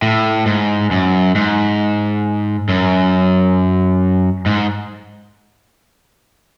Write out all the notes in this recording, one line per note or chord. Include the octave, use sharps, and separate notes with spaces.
A2
G#2
F#2
G#2
F#2
G#2